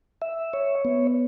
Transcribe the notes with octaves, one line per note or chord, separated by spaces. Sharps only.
E5
C#5
B3